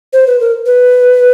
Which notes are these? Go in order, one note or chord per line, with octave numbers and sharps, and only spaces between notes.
C5
B4
A#4
B4